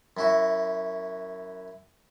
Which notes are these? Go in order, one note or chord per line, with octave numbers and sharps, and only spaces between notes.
F#2 E4 F#4